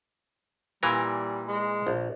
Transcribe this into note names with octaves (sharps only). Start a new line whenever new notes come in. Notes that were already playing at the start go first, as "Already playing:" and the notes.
A#2 E3 G3 A#4
G#3
A#1